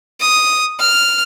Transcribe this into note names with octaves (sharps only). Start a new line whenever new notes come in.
D#6
F6